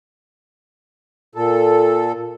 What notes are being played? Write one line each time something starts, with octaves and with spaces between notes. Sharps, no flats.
A#2 A4